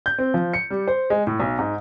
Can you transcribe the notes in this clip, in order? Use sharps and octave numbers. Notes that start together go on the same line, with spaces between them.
G6
C4
F3
C#7
G3
C5
G#3
A2
B1
G#2